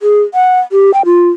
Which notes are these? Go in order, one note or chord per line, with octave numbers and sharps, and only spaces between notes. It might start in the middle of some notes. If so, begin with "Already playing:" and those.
G#4
F#5
G4
G5
F4